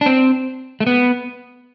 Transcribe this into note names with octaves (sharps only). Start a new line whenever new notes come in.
D4
C4
A3
B3